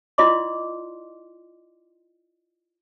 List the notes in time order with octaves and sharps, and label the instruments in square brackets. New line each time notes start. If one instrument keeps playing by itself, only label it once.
[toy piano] E4 F4 D5 D#5 C6 D6